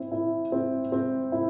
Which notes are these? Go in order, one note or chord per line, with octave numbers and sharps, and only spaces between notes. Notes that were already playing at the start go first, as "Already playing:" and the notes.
Already playing: C4 E4
E4
C4
C4
E4